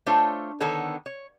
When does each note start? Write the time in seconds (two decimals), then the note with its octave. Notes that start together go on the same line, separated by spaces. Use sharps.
0.06 A3 D4 F4 A4 C5 C#5
0.60 D3 D#3 B3 A4 C#5
1.06 C#5